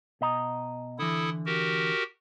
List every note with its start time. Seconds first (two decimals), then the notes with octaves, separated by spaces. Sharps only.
0.21 B2 D#5 A#5
0.99 D3 E3 E4 A4 D#6
1.46 F#4 G4 A#4